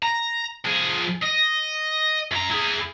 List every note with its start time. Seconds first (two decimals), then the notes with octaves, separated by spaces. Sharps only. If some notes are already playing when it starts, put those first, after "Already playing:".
0.03 A#5
0.65 F3 G#4
1.22 D#5
2.31 F#2 A#5
2.50 E4 G#4